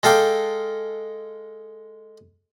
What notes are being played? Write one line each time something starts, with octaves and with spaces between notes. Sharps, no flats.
G#3 A4 F5 G5 D6